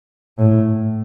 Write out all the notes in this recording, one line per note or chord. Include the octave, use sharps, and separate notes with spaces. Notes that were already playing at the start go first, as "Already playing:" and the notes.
A2